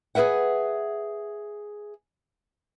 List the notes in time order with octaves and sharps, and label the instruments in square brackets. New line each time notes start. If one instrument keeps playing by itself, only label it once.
[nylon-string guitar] G#4 A4 B4 E5 F#5